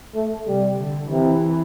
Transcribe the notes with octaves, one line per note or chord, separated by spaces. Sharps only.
A3
C3 G3
D3
C3 E3